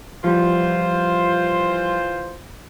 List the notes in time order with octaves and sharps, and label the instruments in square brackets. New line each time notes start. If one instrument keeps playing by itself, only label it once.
[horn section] E3 F4 C5 [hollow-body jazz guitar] F3 G3